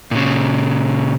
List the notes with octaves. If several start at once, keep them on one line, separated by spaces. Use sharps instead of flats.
A#2 C#3